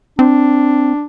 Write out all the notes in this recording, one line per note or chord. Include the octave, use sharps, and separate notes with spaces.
C4 D4